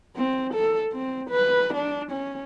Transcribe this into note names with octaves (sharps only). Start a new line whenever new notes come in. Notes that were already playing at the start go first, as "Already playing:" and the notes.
C4
A4
C4
B4
D4
C#4